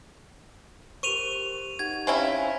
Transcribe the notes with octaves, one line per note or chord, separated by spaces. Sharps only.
G4 A#4 C5 C#6 D#7 F7
D#4 G4 F#5 G#6
C4 C#4 E4 C5 F5 A#5